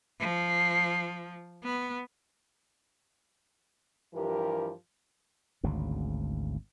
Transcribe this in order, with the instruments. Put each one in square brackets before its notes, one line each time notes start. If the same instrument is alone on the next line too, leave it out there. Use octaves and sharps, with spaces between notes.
[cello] F3
B3
[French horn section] G2 E3 F3 G4 A#4
[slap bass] G#1 D2 C#3